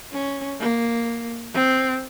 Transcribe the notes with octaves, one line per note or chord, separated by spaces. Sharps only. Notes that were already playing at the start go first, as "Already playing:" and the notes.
C#4
A#3
C4